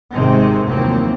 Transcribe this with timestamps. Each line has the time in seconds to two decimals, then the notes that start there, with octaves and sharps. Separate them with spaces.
0.13 G#1 G#2 C3 D#3 G#3 C4
0.65 F1 D#2 E3 F#3 A#3 C4